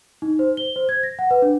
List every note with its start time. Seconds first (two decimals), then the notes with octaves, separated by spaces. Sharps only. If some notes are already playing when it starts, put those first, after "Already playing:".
0.22 D#4
0.39 C5
0.57 G7
0.76 C5
0.89 G#6
1.03 A#6
1.19 F#5
1.31 B4
1.42 D4